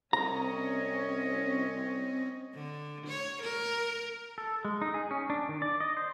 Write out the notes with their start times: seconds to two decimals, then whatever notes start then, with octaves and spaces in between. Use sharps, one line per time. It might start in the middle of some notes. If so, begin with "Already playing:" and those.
0.13 C2 C4 C#4 C#5 D#5 A#5
2.54 D3
3.07 C#5
3.43 A#4
4.38 A4
4.65 G#3
4.82 D#4
4.94 G#4
5.11 C#4
5.30 D4
5.49 D#3
5.62 D5
5.80 D#5
5.97 C5